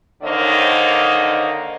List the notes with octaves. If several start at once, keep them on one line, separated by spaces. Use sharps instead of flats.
D3 D#3 A#3 C5 C#5 D#5